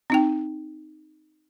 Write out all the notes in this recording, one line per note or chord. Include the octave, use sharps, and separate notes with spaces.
C4 D#4 G5